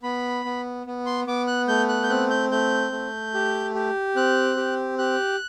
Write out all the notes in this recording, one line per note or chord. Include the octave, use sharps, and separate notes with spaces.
B3 B5
B3
B3
C6
B3 D6
F#6
A3 G6
F#6
G6
C4 F#6
G6
A3 G6
A3
G4
G4
C4 F#6
G4
G4 F#6